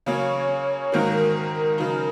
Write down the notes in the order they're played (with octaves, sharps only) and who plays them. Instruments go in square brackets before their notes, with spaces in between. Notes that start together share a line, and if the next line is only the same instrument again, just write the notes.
[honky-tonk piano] C#3 F#3 A#3 C#4 [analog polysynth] C#5
[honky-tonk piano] G#2 D#3 A#3 F#4 [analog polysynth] A#4
[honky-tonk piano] C#3 F#3 D#4